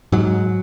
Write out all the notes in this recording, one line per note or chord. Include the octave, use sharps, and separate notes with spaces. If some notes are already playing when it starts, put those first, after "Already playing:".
G#2 F#3